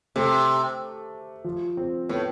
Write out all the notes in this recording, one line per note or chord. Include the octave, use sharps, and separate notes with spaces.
C3 A3
F3
C4
A2 B3